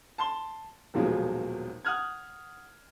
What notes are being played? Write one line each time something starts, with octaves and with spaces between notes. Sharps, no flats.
A5 C6 G7
D#1 D#2 B2 F3 F#3 G#3
F#5 D#6 F6 F#6 G#6